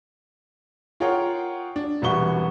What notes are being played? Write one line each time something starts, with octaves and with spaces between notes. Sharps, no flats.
F4 G#4 A#4 C#5 F#5 G5
D4
E1 C2 E3 F#4 C#6 G7